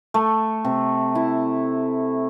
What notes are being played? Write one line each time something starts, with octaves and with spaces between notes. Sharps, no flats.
A3
C3
E4